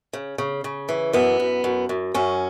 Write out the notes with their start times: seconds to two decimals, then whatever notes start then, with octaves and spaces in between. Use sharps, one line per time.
0.13 C#3
0.38 C#3
0.64 C#3
0.89 E3
1.13 F#2 B3
1.40 F#2
1.64 F#2
1.89 F#2
2.14 F#2 C#4